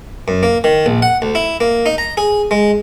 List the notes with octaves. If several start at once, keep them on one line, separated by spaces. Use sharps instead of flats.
F#2
A#3
D#3
A#1
F#5
D2
E4
A#3
D#4
A#5
G#4
G#3